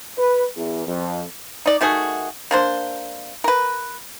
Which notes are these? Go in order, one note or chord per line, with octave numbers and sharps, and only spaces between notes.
B4
E2
F2
D#4 D5
D#3 A3 F#4 G#4
A#3 D4 C5
A#4 B4